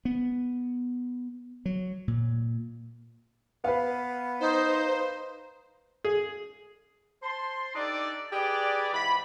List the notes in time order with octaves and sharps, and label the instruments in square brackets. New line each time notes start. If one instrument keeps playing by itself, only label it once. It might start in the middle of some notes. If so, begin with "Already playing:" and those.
[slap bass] B3
F#3
A#2
[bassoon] B3 [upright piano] B4 F5
[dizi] D#4 [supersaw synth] C5
[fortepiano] G#4
[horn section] C5 A5 C6
D4 D#4 G4 A4 D5
G4 G#4 B4 D5
G#2 E3 G4 B5